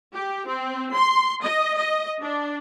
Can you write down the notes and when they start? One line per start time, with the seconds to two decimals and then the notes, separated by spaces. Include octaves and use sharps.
0.14 G4
0.48 C4
0.94 C6
1.43 D#5
1.77 D#5
2.21 D4